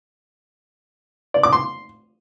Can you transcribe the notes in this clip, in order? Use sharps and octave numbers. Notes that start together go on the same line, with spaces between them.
D5
D6
C6